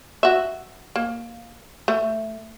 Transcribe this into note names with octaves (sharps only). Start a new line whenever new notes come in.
F#4 E5
A#3
A3